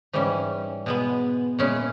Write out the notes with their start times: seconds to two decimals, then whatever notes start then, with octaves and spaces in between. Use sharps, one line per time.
0.13 G#2 E3 G3 C#4
0.86 B2 G#3 B3
1.59 A#2 G#3 C#4 E4